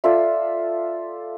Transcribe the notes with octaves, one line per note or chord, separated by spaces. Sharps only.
F4 A4 D5 E5